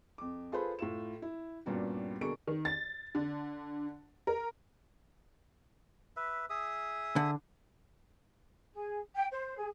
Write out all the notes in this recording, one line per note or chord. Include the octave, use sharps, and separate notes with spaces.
F2 D6
F4 G#4 A4 B4 C5 B5
A2 F4 E7
E4
G2 A#2 G3 B3 C#4 F#4
B2 D3 A#3 G#4 C#6 D7
D#3
A6
D3
A#4
B4 E5
G#4 E5 D#6
D3
G#4
G5
C5
G#4